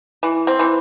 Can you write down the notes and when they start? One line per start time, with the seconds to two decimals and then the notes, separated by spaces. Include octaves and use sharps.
0.23 E3
0.47 C4
0.59 E3